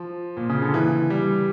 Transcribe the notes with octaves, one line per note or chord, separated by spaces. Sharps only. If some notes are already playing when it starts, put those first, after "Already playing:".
Already playing: F3
A#2
C#3
D3
E3
G3